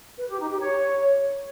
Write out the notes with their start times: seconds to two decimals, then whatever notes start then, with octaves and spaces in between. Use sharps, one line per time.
0.18 B4
0.29 G4
0.39 D#4
0.50 G4
0.61 C#5